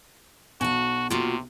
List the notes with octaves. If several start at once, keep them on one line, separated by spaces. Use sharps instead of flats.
B1 F#4 G#5 A5
C3 A#3 F4 F#4